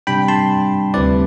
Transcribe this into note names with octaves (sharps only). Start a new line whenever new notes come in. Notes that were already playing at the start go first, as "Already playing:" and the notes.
C3 G3 D4 G5 B5
A5 C6
D2 C3 G3 C4 E4 B4 D5